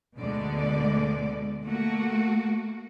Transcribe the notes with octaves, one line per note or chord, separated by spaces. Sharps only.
D2 B2 D3 G#3 A3 D5
A3 A#3 F#4